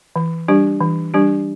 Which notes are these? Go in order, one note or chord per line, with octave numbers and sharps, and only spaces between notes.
E3
G3 D4 G4
E3
G3 D4 G4